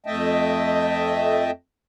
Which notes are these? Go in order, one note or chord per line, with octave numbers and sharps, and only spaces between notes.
F2 A3 D#5 E5 G5 A5